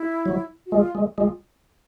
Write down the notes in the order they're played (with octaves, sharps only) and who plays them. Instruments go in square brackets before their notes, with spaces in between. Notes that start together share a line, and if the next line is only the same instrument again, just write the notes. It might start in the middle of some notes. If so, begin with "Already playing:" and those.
Already playing: [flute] E4
[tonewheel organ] F#3
[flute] F#4
[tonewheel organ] G#3 [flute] F4
[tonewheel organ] G#3
[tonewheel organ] G#3 [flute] F4